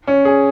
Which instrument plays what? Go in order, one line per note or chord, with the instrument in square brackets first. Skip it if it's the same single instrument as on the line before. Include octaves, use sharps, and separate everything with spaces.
[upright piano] C#4
G#4